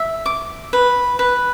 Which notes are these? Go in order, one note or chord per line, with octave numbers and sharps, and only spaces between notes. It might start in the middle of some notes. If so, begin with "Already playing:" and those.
Already playing: E5
D6
B4
B4